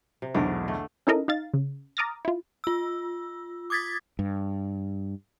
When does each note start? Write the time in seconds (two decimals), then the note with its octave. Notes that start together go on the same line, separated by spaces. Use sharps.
0.22 C3
0.35 B1 E2 D3 A3 A#4
0.68 A3
1.07 C#4 D#4 E4 A4 A#4 D#5
1.28 D#4 F5 A6
1.54 C#3
1.97 A#5 D6 D#6 F6 A6 A#6
2.25 E4 F4
2.64 F4 E6
3.70 D6 D#6 G#6 A6 B6
4.19 G2